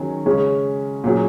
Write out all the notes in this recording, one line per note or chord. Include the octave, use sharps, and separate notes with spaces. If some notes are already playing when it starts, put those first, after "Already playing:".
Already playing: D#3 F#3 C#4 G#4
C#3 G#3 C#4
A#2 F#3 C#4 G#4